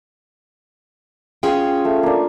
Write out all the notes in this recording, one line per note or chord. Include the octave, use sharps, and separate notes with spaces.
C#4 F4 G#4 G5 G#5
A3
A#3 D4